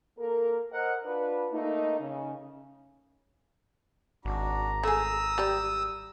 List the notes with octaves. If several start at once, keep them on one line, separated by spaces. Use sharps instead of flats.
A#3 A4 A#4
A#4 C5 D#5 F#5
D4 F4 B4
A3 A#3 D#4
C#3
G#1 D4 F#4 A#5
A3 G#4 D#6 E6
G3 G4 D5